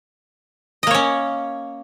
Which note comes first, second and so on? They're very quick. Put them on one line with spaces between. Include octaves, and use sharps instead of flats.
D#5 A#3 C#5 C#4